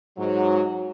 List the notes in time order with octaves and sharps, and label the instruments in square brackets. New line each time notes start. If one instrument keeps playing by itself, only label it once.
[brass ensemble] G#2 F#3